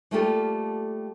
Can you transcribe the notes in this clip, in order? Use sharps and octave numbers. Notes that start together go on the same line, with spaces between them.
G3 A3 A#3 F4 G4 A4